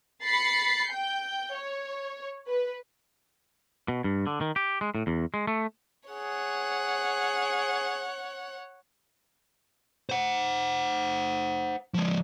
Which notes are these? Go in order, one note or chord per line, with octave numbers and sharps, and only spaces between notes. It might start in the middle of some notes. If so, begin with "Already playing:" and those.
B5 A6 C7 C#7
G5 G6
C#5
B4
B2
G2
D3
D#3
G4
G#3
A2
E2
G#3
A3
G#4 C#5 F#5
C5 F#5
F3 G#3